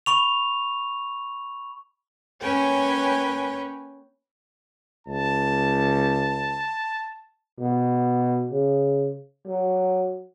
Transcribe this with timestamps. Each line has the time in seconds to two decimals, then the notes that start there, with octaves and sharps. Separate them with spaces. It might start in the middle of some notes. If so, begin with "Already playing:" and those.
0.06 B5 C#6 F7
2.41 A#3 C#4 B4 C#5 G5 G#5
5.07 C#2 A5
7.60 B2
8.52 C#3
9.47 F#3